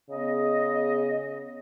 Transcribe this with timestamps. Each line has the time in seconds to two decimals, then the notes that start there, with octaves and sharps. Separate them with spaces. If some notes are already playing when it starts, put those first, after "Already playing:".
0.09 C#3 B3 G#4 D#5